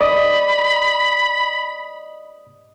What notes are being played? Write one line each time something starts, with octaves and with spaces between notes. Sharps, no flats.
D5 D#5 B5